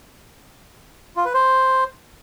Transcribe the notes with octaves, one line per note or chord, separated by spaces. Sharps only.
F4
B4
C5